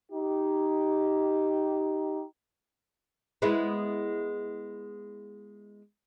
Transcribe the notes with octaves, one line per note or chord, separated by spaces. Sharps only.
D#4 G4
G#3 B3 E4